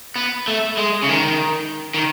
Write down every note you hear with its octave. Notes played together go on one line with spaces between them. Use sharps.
B3
A3
G#3
C#3
D#3
D#3